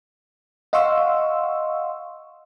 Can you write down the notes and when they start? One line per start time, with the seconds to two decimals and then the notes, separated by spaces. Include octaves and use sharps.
0.73 D#5 F5 F#5 C6 C#6 E6